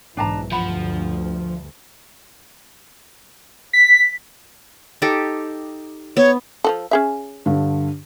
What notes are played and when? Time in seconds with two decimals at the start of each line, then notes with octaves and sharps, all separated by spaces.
0.17 B1 G#2 E3 D4 A5 A#5
0.52 D2 G2 F3 F#5 B5
3.73 B6
5.02 D#4 G4 A4
6.17 B3 C#5
6.64 F3 F#4 A4
6.91 C#4 G#4 E5
7.46 G2 D3